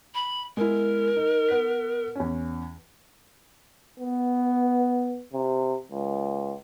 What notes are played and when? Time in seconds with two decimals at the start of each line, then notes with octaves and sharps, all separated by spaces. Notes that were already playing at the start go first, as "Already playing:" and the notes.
0.14 B5
0.57 G#3 B3 E4 A#4
1.16 D#4
1.49 B3 F#5 B6
2.15 E2 C#4
3.99 B3
5.34 C3
5.91 C#2